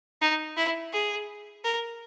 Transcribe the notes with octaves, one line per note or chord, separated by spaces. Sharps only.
D#4
E4
G#4
A#4